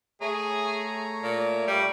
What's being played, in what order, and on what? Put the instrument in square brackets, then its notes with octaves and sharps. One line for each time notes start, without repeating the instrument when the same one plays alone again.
[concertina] A3 C#5 A#5 [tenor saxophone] G#4
[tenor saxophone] A#2
G3